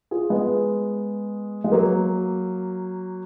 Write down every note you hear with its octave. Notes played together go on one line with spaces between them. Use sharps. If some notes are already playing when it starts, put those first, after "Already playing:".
F4 G#4
G#3 B3
G#3
F#3 A#3